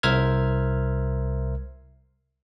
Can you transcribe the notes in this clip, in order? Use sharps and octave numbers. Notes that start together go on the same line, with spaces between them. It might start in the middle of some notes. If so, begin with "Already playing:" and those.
C2 A#4 C5 E5 F6 G#6